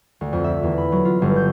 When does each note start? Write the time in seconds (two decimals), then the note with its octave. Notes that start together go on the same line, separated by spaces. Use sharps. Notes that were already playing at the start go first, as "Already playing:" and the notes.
0.21 D2
0.33 F2
0.44 E5
0.63 E2
0.78 B5
0.92 F#3
1.05 F4
1.22 G1
1.36 G6